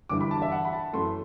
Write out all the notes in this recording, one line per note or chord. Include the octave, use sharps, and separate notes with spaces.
G1 G2 E3 D6
B5
A5
E5
F#5
B5
A5
F#2 E3 A3 C6